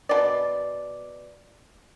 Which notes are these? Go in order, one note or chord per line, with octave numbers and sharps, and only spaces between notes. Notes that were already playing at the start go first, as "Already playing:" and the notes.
B2 D5